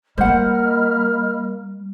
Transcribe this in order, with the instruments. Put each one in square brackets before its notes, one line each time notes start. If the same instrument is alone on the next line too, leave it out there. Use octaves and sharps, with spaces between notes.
[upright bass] G3 [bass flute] A#3 [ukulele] C5 F#5 [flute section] D#5 B5 F6